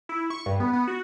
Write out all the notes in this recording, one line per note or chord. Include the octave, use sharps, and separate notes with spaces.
E4
C#6
G2
B3
B3
F#4